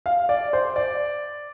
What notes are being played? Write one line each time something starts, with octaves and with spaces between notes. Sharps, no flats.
F5
D5
C5
D5